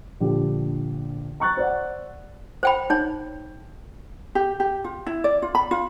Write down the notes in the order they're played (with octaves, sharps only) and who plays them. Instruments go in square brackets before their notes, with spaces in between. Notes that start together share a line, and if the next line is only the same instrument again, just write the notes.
[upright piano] A#1 D3 G4
A#5 C#6 F#6 A6
C5 D5 F#5
[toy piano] C5 G5 B5
D#4 C#5
[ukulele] G4
G4
F4
E4
D5
F4
B5
F4